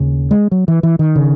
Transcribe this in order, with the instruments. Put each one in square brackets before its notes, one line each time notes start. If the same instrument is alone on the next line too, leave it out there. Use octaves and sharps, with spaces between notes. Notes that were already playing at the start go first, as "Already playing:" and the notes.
Already playing: [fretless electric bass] D#2 C#3
G#3
F#3
E3
E3
D#3
C#3